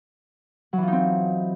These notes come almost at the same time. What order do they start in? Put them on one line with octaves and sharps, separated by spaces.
F#3 E3 F4 D#4 C4